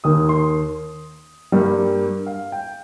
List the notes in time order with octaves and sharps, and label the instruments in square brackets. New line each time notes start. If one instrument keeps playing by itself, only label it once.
[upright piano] D#2 D#3 A#3 D#6
C6
G2 G3 A#3
F5
G5